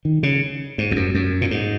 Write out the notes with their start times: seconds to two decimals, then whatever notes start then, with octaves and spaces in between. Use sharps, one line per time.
0.05 D#3
0.23 C#3
0.78 G#2
0.91 E2
0.96 F#2
1.15 F#2
1.41 A#2
1.51 G#2